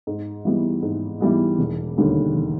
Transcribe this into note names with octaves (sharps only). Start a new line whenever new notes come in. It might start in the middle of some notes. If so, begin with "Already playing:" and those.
G#2
E3 G3 B3
G#2
E3 G3 B3
E1
D#2 D3 G3 A#3
E1